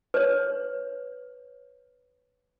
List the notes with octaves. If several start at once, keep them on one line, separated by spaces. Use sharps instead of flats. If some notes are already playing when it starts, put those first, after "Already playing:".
B4 C#5